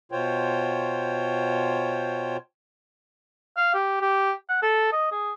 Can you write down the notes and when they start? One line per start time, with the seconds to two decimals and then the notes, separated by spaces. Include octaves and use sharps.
0.12 B2 F4 C5 C#5 G5
3.57 F5
3.74 G4
4.01 G4
4.49 F#5
4.62 A4
4.92 D#5
5.12 G#4